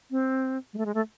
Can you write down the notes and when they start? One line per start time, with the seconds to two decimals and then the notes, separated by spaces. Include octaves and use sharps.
0.11 C4
0.73 G#3
0.78 A3
0.86 G#3
0.94 A3